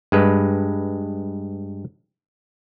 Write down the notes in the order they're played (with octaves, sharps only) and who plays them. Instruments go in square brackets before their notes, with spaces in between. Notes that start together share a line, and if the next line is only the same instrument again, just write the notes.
[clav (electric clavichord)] G2 G#3 B4